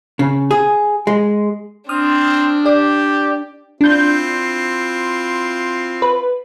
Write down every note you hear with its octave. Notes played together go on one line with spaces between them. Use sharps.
C#3
G#4
G#3
C4 D4 D#6 F6
G4 D5
C4 D4 E4 F4 G6
B4